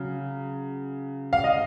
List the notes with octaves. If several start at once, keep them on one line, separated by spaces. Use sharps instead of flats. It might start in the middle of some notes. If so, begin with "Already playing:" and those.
Already playing: C#3 F#3
F5
D#5